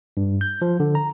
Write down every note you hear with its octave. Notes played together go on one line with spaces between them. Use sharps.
G2
G6
F3
D3
A#5